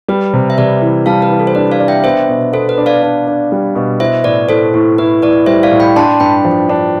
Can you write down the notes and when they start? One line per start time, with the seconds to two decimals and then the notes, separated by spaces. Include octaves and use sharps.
0.08 G3 B4
0.33 C3
0.50 E5
0.58 C3 B4 D5
0.82 E3
1.06 G3 F5 A5
1.22 B4
1.30 E3
1.39 A4
1.47 C5
1.55 D4 B4
1.71 D5 F5
1.80 D4
1.88 E5 G5
2.04 B3 C5 E5
2.29 B2
2.53 B3 A4 C5
2.69 B4
2.78 D4
2.86 D5 F5
3.03 D4
3.27 D4
3.52 G3
3.75 B2
4.00 E4 C5 E5
4.24 A2 B4 D5
4.49 A2 A4 C5
4.74 A2
4.98 E4 B4
5.22 A2 B4 D5
5.46 G3 C5 E5
5.63 D5 F5
5.72 A2
5.80 G5 B5
5.96 D4 A5 C6
6.20 G2 G5 B5
6.45 F3
6.69 D4